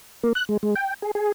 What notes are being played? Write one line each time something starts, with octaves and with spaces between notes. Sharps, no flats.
A#3
F#6
G#3
G#3
G5
G#4
G#4